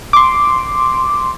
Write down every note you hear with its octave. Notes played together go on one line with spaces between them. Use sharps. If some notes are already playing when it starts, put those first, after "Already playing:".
C6 D6